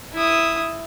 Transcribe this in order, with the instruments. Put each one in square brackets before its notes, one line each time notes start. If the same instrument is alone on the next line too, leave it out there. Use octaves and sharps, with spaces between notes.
[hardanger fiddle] E4 D#6